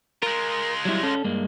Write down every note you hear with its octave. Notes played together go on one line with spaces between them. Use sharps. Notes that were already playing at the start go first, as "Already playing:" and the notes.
G#3 F4 A#4
F#3 G3 E4
C#4 A4
G2 G#3 A#3